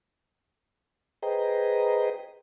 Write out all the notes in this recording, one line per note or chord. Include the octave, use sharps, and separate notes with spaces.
G#4 B4 C5 D#5 G5 A#5